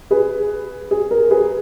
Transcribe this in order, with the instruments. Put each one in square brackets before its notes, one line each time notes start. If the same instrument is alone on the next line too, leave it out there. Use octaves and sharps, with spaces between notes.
[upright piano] G#4 B4
G#4
A#4
G#4 B4